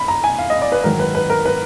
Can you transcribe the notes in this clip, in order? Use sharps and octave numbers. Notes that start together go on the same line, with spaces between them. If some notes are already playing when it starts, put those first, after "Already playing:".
Already playing: B5
A#5
G#5
F5
D#5
D5
B4
G#2 D#3 F#3 A#4
B4
B4
A#4
B4